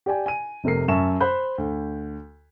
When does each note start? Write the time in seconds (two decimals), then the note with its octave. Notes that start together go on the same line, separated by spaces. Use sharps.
0.06 G4 D5 G5 G#5
0.26 G#5 D#7
0.64 F1 C3 A3 A#4 C7
0.88 F#2 E5 A5 C#6 E7
1.20 C5 B5 F#6 G6
1.58 D2